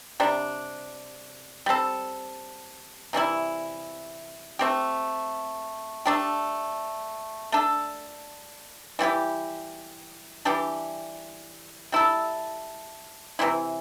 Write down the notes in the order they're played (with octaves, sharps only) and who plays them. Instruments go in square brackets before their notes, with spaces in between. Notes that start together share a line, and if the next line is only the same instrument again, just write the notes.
[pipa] C3 G3 D4
G3 C4 A4
C3 E3 G3 E4
A3 C4 G4
A3 D4 G4
A3 D4 A4
E3 G3 E4 G4
E3 G3 D4 G4
G3 E4 A4
C3 E3 C4 E4